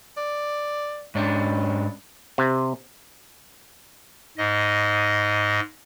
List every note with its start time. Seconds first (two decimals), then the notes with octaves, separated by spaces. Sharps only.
0.17 D5
1.15 G#2 C#4 D4
2.38 C3
4.38 G#2 D#5